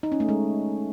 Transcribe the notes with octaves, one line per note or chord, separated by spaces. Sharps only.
D#4
C#4
A3
G#3